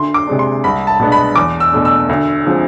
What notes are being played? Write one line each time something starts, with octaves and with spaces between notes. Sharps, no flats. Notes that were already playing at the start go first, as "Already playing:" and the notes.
Already playing: D2 C6
D6
C3 G#3 D4
C6
C2 B5
A5
B2 G#3 B3 D4
B5
E2 D6
E6
B2 A3 D4
E6
D2
D3 F3 G#3 C4